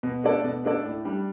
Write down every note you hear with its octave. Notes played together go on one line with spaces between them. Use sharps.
B2
A3 D4 A4 D5
B2
A3 D4 A4 D5
A2
G3 D4